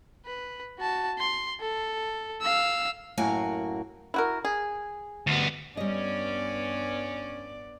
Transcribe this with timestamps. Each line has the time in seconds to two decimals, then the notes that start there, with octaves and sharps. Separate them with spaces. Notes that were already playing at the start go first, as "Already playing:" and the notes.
0.26 B4
0.79 F#4 A5
1.19 C6
1.61 A4
2.42 F5 E6
3.17 F#2 A2 A#3 F#4 A#4 G#5
4.14 E4 F#4 A#4
4.45 G#4
5.27 D2 B3
5.77 G2 G3 B3 C#4 D5 D#5